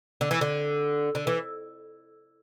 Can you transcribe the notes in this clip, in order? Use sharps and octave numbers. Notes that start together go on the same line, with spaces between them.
D3
E3
D3
D3
E3